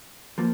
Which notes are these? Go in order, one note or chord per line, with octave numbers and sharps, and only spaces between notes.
F3 A#3